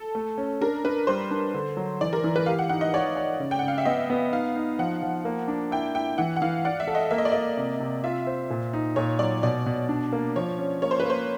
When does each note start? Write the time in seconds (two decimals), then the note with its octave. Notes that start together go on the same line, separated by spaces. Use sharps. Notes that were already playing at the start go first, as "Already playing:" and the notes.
Already playing: A4
0.15 A3
0.38 C#4
0.61 D4 A#4
0.84 D4 B4
1.07 G3 C5
1.31 D4
1.54 D3
1.77 F#3
2.01 E3 D5
2.13 A#4
2.24 E3
2.36 B4
2.46 G4 F5
2.59 F#5
2.69 D#4 F#5
2.81 D#5
2.94 C#5 D5
3.16 C#5
3.40 C#3
3.51 G5
3.59 C#3 F#5
3.68 F5
3.78 E5
3.85 B3 D#5
4.10 B3
4.32 D#4 F5
4.56 D#4
4.79 F3 F#5
5.03 F3
5.25 A#3
5.48 D4
5.71 E4 G5
5.95 E4 G5
6.18 E3 F#5
6.36 F#5
6.42 E3 F5
6.65 D5 F#5
6.80 E5
6.88 A4
6.95 D#5
7.11 A#3 E5
7.18 D#5
7.25 D5
7.32 A#3 D#5
7.57 C3
7.80 C3
8.04 F4 E5
8.27 C5
8.50 A#2
8.73 D#4
8.96 A#2 C#5
9.19 F#3 D5
9.43 B2 D5
9.66 B2
9.89 D4
10.13 A#3
10.36 F3 C#5
10.58 C#4
10.82 A#3 C#5
10.91 C5
11.00 B4
11.05 A#3 C5